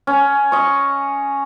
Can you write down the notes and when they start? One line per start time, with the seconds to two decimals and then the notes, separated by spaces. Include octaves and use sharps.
0.07 C#4
0.52 D#5 C#6